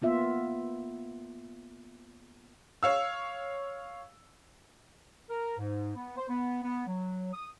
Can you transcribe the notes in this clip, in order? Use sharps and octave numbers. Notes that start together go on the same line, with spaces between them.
A#3 B3 F4 E5
C#5 F5 E6
A#4
G#2
B3
C5
B3
B3
F#3
D#6